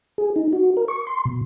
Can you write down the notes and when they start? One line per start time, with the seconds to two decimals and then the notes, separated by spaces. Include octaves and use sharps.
0.18 G#4
0.36 D#4
0.53 F#4
0.77 A#4
0.88 C#6
1.07 C6
1.25 B2